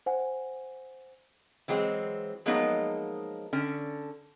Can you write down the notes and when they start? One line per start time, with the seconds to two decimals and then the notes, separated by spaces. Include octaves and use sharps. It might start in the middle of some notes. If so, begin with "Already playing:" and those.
0.06 C5 F#5 G#5
1.68 E3 F#3 G#3 C4
2.46 F3 F#3 G#3 A#3 B3 D#4
3.53 D3 C#4